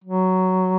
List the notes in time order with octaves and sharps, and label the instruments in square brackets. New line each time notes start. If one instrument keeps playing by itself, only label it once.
[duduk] F#3